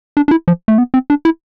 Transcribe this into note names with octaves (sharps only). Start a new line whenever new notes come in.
D4
D4
E4
F3
A3
B3
C4
D4
E4